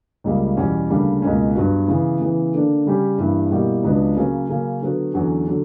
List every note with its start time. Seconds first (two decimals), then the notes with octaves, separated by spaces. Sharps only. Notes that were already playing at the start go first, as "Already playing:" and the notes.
0.24 C#2 C#3 G3 A#3
0.57 E2 B2 G3 C#4
0.89 D2 C#3 G3 A#3 D4
1.22 C#2 B2 A#3 C#4
1.55 G2 F#3 B3 F#4
1.88 C#3 E3 B3
2.20 C#3 E3 B3
2.53 D3 A#3 D4
2.85 C#3 G3 C#4 G4
3.18 G2 E3 G3 A#3 E4
3.51 B2 G3 A#3 E4 G4
3.83 C#2 C#3 F#3 B3 D4
4.16 C#3 F#3 A#3 C#4
4.49 C#3 F#3 A#3 C#4
4.82 D3 F#3 B3 F#4
5.14 E2 D3 F#3 C#4
5.47 D3 F#3